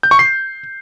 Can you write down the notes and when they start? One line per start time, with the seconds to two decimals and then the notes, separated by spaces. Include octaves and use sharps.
0.03 G6
0.11 C#6
0.19 C7